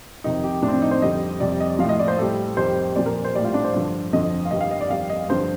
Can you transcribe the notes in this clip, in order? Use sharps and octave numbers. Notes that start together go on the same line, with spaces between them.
F2 C3 D#3 D#4
G4
A2 F3 D4
C4
D4
D#4
C5
F2 D3 G3 D#5
F2 C3 G3 D5
D#5
F3 F5
A2 D#5
D5
C5
A2 G3 A4
F2 D#3 G3 C5
A#2 F3 D5
A#4
C5
A2 G3 F4 D5
D4
C5
G2 D3 F3
F2 D3 F3 D#5
F5
G2 D#3 G3 D#5
F5
D#5
D5
F2 D#3 G3 F5
D#5
G2 D3 F3 C5